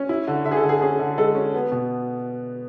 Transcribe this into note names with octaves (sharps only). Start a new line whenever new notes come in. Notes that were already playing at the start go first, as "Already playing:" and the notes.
Already playing: C#4
E4
D3
D3 E5
G#4
A4
D3
G#4
C#4 G#4
D3
G#3 A4
C#4
B3
B2